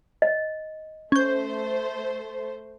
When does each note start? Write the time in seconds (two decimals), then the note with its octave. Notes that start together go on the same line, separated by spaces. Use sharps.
0.22 D#5
1.12 A3 C#4 C5 G6